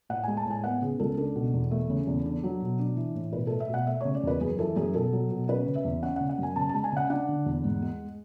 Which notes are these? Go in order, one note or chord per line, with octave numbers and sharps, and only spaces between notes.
A2 F#5
G#3 G#5
A5
A2
G#5
B3 F#5
C#3 G#4
C#2 A4
D4 A4
B2
E2
A3
C#3
E2
D4
F#3
B2
D4
E3
A2
B2 B4
A3 A4
E5
B2 F#5
A3 E5
C#3 C#5
D5
E2 B4
F#2 G#4
E3 A4
F#2 G#4
B2 A4
F#3
B2
C#4 B4
C#3
E5
E2
C#4 F#5
C#3 F#5
F#5
F#2 G#5
C#3 A5
G#3 A5
G#5
C#3 F#5
D4 F#5
D3
E2
G#2
G#3